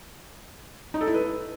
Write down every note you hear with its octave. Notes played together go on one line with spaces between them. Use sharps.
D#4
A4
E4
B4